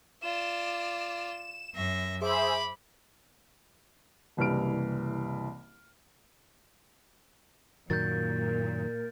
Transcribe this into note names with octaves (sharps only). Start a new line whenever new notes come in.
F4 D5 E7
F#2 E5 A#6
G#4 C5 E5 B5 D6
F#1 C2 E3 G3 F6 D7
F#2 A#2 D#3 F#3 A#4 G6 A6